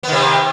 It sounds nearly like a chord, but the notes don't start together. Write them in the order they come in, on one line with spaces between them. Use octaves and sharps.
B3 D#3 C3